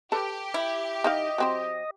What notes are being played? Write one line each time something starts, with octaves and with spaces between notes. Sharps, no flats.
G4 A4 B4 A5
E4
D#3 D#4 D#5 F5
F#3 C4 C5